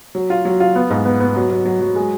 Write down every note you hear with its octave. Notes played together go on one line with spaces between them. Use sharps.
F#3
F4
F#3
F4
B3
G#2
B3
B3
F#3
F#3
F#3
F#3
G#3